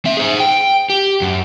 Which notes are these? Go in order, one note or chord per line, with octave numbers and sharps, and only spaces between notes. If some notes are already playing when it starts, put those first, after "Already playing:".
C4 E5
G#4 C5
G5
G4
F#2